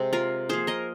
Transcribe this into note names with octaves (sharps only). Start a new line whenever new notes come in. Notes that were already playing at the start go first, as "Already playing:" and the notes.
Already playing: C3 G#3 C4
F4 A#4
F3 A#3 G#4 C5
A#4 D#5